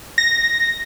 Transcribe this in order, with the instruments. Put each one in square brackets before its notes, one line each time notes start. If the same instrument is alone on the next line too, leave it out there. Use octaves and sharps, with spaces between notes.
[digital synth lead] A#6